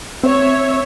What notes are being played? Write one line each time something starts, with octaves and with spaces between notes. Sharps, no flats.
C4 C#5 E5